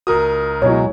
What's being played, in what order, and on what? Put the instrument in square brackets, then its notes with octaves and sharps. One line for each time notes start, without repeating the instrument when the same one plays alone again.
[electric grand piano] C#2 A#4 D#6 [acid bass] F#4
[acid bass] B2 [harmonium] F#3 G#3 [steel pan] E4 C#5